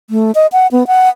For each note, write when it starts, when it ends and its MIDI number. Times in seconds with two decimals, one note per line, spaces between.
0.10 0.32 57
0.35 0.47 75
0.52 0.67 78
0.72 0.87 59
0.87 1.09 78